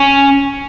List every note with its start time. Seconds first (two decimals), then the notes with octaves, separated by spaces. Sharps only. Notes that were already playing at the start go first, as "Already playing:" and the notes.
Already playing: C#4